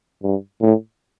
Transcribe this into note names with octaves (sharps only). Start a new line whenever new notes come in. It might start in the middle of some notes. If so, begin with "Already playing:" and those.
G2
A2